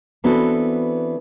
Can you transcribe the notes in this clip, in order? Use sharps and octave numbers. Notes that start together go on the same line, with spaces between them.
E3 B3 C4 D4 F#4 A4